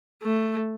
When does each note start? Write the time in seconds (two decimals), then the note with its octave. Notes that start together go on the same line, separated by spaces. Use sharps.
0.22 A3